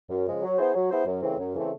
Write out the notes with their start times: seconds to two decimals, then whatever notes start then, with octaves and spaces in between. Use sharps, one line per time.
0.10 F#2
0.26 C#3 F3 G#3
0.42 F#3
0.58 B3 E4 G#4 C5
0.75 F#3
0.90 B3 E4 G#4 C5
1.06 F#2
1.22 C#3 E3 A3 C4
1.38 F#2
1.54 C#3 E3 A3 C4